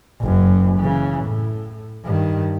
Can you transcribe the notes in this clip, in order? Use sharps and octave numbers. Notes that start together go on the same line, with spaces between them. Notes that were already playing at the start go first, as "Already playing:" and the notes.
F#1 F#2
C#3 E3
A2
G2 D#3